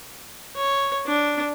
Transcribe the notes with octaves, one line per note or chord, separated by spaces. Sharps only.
C#5
D4